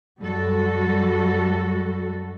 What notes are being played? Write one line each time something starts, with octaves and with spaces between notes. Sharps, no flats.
F#2 G3 F#4 A4